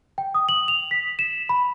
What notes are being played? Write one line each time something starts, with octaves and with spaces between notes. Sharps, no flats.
G5
D#6
F#7
F7
B6
E7
B5